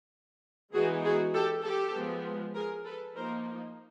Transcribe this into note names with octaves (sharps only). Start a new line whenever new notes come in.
E3 G#3 B3 D#4 F#4 G#4
F#4 G#4
G4 A4
G4 A4
F3 G#3 B3
G#4 A#4
A4 B4
F3 A#3 D#4 A#4 C5